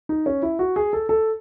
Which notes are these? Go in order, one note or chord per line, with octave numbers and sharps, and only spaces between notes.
D#4
C#4
E4
F#4
G#4
A4
A4